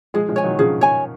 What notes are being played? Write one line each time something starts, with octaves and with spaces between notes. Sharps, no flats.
F3 G#3 G#4
F3 G#3
C#5 G#5
D#3 F#3
C#3 F3 G#4
C#5 G#5